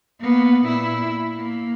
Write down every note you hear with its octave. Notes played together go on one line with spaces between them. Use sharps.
A#3 B3
A#2 E4
A#3